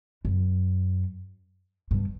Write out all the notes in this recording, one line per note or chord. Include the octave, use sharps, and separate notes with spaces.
F#2
G2